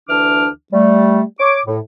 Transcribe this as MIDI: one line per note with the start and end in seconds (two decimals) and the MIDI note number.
0.09 0.48 38
0.09 0.48 52
0.09 0.48 62
0.09 0.48 86
0.09 0.48 89
0.73 1.22 55
0.73 1.22 57
1.40 1.60 73
1.40 1.60 86
1.66 1.78 45